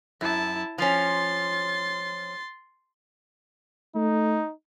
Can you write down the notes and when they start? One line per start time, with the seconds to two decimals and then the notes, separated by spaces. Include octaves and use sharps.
0.21 F#2 E4 A5
0.78 F3 C#4 C6 A6
3.96 A3 D#4